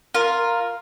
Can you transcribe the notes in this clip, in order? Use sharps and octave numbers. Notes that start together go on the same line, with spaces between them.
F4 A#4